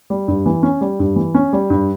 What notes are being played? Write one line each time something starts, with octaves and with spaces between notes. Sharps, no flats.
G3
G2
E3
C#4
G3
G2
E3
C#4
G3
G2